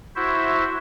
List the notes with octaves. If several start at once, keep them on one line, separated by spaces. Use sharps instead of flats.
E4 F#4 C5 E5